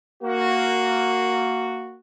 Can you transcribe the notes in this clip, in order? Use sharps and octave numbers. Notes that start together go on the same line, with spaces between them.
A#3 F#4